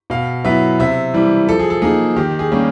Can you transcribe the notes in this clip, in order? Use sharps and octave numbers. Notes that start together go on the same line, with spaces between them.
B2 F5
F#3 B3 E4 E5
C3 E5
E3 G3
F3 A4
G#4
A4
A#3 D#4 G#4
D#3 G4
G#4
G3 A#3 C#4